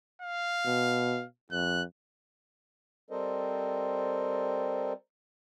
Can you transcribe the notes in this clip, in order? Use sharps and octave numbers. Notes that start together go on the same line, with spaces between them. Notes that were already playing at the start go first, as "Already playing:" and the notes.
F5
B2
F2 F#6
G3 C4 A4 A#4 C5 D#5